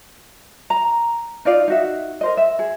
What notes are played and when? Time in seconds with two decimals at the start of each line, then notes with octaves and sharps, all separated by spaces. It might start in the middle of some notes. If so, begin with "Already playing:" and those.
0.70 A#5
1.45 D#4 F4 D5 F5
1.68 D#4 F#4 E5
2.21 A#4 C5 D#5
2.37 E5
2.59 G#4